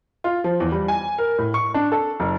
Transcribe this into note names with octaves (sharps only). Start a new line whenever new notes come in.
F4
F3
E2
G3
G#5
A#4
A2
C#6
D4
A4
F#1